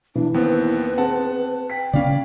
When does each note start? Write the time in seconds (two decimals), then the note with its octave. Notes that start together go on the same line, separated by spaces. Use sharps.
0.15 E3 D4
0.34 D#2 B3 C4 B4
0.98 C4 G#4 F#5 A5
1.70 G5 B6
1.93 C#3 C4 C#4 D5 F5